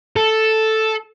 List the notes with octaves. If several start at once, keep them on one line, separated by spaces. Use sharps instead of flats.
A4